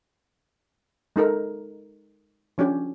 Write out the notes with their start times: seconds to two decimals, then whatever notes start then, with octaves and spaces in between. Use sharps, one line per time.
1.16 G#3 D#4 A4 A#4
2.58 F3 C#4 D4 G4